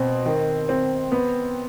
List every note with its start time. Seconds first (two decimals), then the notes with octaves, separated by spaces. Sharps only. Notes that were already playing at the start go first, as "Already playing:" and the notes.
Already playing: B2 C4
0.26 D#3
0.69 C4
1.12 B3